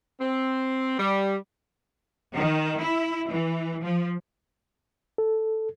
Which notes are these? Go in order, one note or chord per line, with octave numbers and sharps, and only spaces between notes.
C4
G3
D#3
E4
E3
F3
A4